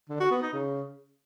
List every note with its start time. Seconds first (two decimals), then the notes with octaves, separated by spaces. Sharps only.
0.09 D3
0.20 F#4
0.31 B3
0.42 D#4
0.53 C#3